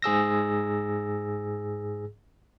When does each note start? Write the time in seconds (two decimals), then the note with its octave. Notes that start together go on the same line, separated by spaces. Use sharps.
0.02 G#2 G#4 E6 A#6